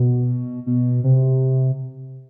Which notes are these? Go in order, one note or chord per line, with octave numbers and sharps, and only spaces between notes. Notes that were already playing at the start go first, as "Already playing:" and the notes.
Already playing: B2
B2
C3